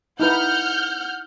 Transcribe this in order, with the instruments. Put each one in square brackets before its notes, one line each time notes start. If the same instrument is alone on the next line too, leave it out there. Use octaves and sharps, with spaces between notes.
[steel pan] D#4 E4 B4 [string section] F#5 F6 G6